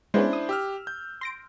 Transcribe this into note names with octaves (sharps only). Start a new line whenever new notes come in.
G#3 B3 C#4 D4 E4 C5
D#6
G4 E6 F6
G6
C6 A#6 D7